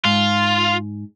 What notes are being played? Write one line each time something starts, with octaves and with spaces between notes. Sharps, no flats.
G#2 F4